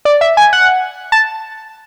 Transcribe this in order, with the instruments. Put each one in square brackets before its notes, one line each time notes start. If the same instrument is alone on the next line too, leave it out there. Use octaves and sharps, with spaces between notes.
[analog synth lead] D5
E5
G#5
F#5
A5